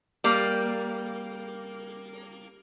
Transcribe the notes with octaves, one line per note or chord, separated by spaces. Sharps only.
G3 A#3